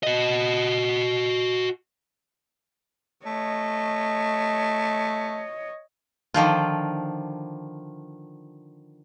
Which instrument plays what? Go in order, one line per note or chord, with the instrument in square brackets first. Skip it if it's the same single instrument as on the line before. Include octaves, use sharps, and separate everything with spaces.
[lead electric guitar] F#4 D#5
[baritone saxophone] A3 [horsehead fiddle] C#5 D#5
[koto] D3 D#3 F3 F4